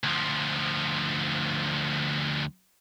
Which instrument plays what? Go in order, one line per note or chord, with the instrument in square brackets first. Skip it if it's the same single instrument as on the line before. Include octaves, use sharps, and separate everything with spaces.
[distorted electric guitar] D2 F3